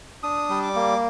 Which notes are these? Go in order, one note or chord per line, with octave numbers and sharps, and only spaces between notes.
D4 D#6
G3
D6
A#3